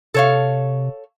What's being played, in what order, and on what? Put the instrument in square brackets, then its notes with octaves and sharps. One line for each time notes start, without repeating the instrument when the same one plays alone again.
[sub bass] C3 [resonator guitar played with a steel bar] A4 C#5 F5